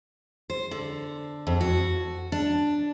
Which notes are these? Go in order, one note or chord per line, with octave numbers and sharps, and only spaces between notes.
C5
D3
F2
F#4
D4